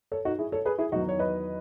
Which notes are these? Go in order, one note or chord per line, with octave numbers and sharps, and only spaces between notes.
A4 C#5
D#4 F#4
E4 G#4
A4 C#5
G#4 B4
E4 G#4
E2 D#3 F#3 D#4 F#4
C#5
B4 D#5